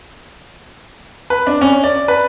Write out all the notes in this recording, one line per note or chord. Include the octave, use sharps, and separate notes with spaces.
B4
D4
C#4
D5
B4